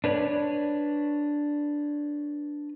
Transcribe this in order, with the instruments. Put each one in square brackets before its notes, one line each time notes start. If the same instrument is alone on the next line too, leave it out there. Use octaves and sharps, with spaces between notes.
[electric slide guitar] D4 B4 C#5 D5